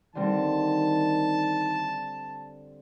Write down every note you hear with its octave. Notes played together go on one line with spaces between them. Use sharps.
D3 D#3 G3 C4 A5